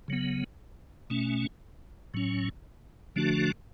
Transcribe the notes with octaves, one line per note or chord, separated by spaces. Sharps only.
C#3 F#3 B3
B2 A3 C#4
A2 F#3 C#4
D3 F3 A3 D4 F#4